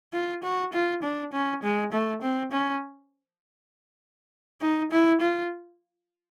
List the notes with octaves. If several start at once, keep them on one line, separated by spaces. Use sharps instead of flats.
F4
F#4
F4
D4
C#4
G#3
A3
C4
C#4
D#4
E4
F4